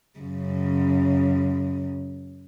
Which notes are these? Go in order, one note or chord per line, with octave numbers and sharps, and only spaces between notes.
F#2 C#3